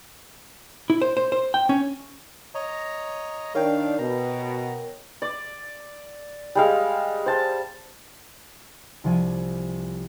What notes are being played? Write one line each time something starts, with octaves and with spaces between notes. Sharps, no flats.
E4
C5
C5
C5
G5
C#4
C#5 D#5 A#5
D#3 D4 A#4 C#5 F5 G5
B2 A#5
D5
G3 G#3 F5
C5 A5
C2 F3 D5 G#5